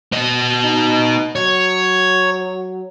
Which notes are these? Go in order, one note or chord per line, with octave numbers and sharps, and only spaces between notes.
B3 D#5
D#4
F#3 C#5